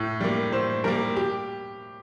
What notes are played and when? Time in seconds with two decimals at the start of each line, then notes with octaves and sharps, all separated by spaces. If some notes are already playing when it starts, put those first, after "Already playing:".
Already playing: A2
0.21 G3 A#3
0.52 A2 C5
0.84 G3 A#3 A#4
1.16 G4